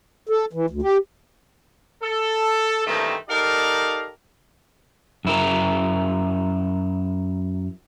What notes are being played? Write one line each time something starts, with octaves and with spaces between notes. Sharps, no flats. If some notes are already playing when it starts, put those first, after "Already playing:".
A4
E3
D2
G4
A4
G2 D#3 E3 A3 A#3 C4
D#4 G4 A4 A#4 D5 F5
F#2 E4 A#4